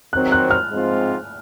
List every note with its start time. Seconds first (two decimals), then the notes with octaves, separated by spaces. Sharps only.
0.13 D#3 F#3 C4 F#6
0.32 F#6
0.51 F6
0.70 G#2 F3 G#3 C4 F4